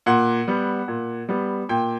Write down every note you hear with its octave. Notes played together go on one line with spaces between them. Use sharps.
A#2 F#5
G3 B3
A#2
G3 B3
A#2 G5